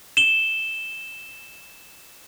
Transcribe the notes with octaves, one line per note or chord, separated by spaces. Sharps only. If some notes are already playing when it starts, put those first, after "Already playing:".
E7 G7